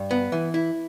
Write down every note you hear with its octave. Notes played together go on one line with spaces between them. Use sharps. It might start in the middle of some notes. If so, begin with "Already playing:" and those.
Already playing: G2
B3
E3
E4